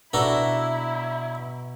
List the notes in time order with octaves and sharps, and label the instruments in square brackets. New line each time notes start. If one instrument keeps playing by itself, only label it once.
[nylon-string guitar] B2 [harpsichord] D4 F#4 A4 [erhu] E4 [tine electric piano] B4 A#5